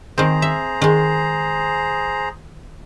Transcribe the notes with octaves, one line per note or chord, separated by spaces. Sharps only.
D#3 C4 G#4 C5 A#5
E5
D#3 G#3